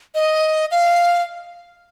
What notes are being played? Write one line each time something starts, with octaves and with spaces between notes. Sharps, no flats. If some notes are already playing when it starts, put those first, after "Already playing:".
D#5
F5